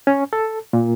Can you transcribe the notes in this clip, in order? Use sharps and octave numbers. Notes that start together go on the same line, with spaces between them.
C#4
A4
A#2